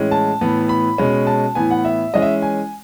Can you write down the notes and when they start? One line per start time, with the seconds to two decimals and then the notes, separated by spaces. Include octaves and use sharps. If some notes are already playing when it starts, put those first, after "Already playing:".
Already playing: A2 E3 G#3 C#4
0.11 A5
0.41 A2 E3 B3
0.69 B5
0.98 B2 G#3 C#4
1.27 A5
1.55 A2 E3 B3 G#5
1.71 F#5
1.85 E5
2.14 E3 G#3 C#4 D#5
2.22 E5
2.42 G#5